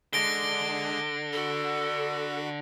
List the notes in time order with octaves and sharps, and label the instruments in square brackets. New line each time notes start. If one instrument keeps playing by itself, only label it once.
[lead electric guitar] D3 [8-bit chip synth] G#3 D4 G#4 [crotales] A#6 D7 G7
[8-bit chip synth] F#4 B5 [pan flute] A4